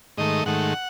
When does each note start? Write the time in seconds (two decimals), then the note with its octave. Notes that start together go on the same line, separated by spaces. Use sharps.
0.17 G#2 D#3 A3 D#5
0.45 G#2 D#3 A3 F#5